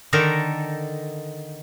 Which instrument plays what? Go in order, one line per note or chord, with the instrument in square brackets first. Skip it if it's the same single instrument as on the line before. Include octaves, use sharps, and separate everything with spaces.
[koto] D3 D#3 D#4 A4 A#4